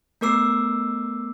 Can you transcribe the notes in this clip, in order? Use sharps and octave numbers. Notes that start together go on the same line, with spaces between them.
A3 B3 A#4 D6 E6 C7